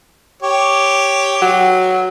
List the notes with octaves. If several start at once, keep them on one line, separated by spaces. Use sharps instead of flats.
G4 C#5
F#3